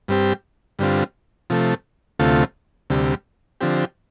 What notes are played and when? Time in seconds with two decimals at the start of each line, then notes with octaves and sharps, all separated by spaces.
0.08 G2 G3 C4 G4
0.79 G2 D3 G3 C4 F4
1.50 C3 F3 A3
2.19 D2 C3 A3 F4
2.90 D2 C3 G3
3.61 D3 F3 C4 G4